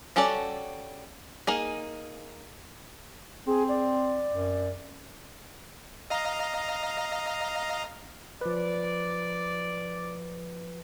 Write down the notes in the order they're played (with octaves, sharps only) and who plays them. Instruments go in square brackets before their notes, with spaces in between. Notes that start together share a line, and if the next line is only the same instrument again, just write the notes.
[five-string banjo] G3 C#4 F#4 A4 D5
A#3 D#4 G#4
[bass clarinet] C4 [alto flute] G#4
[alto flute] D5
[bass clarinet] F#2
[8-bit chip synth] D#5 F5 A#5
[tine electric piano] F3 B4 [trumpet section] D5